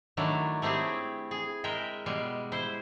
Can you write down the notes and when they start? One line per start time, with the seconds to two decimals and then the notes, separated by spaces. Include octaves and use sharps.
0.17 D#3 F#3 A3 D4 E4
0.62 A3 C4 E4 G4 G#4
1.31 G#4
1.64 G#3 A#4 E5 G5
2.06 B2 G3 G#3
2.52 E4 C5